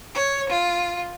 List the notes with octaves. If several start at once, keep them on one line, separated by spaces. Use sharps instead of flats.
C#5
F4